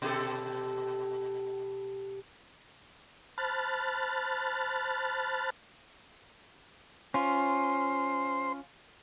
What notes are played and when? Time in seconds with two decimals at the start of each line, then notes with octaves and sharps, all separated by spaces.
0.02 B2 G4 A4
3.38 C5 A5 B5 F6 F#6 A6
7.14 C#4 F4 C5 C6